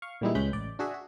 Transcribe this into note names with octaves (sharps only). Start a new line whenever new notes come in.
F5 C#6
A#2 E3 G3 G#3 D#4 E4
C#2 G#3 C#4 B4 B5 G6
A1 D5
D4 F#4 G#4 E5
F#4